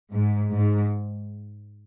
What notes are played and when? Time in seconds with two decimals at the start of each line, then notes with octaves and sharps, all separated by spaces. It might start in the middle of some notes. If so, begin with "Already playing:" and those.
0.12 G#2
0.52 G#2